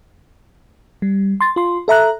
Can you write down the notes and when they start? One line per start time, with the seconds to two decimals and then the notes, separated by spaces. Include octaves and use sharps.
1.02 G3
1.41 C6 A6
1.56 F4 C6
1.88 A4 E5 A#5 F#6